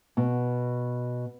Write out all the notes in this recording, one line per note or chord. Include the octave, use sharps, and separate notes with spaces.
B2